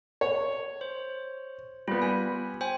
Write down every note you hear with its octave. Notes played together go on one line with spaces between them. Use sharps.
C#5
C5
G3 B3 F4
G#5
C5 G5 G#5